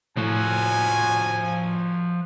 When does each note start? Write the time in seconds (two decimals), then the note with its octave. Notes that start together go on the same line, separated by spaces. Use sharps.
0.17 A2 F3 F#4 G#5